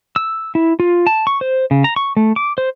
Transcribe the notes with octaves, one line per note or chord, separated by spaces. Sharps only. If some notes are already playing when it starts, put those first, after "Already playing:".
E6
E4
F4
A5
C#6
C5
C#3
A#5
C#6
A3
D6
C5